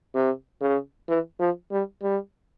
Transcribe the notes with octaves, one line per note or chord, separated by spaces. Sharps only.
C3
C#3
E3
F3
G3
G3